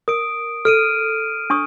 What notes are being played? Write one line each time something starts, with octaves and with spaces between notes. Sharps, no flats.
A#4 D#6 D7
A4 F6 D7 D#7
D4 C#6 D#6